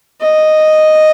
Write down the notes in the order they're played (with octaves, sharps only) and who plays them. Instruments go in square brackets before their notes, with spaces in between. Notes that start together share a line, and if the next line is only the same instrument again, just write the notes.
[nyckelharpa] D#5